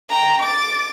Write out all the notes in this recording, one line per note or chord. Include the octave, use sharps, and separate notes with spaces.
G5 A#5
D6 A6